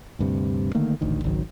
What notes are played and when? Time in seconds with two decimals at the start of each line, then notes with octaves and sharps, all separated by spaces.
0.19 D2 G2 C3
0.75 D3 D#3 A3 A#3
1.01 D#1 A1 D2 D#3
1.24 G#1 C#2 D#3 F#3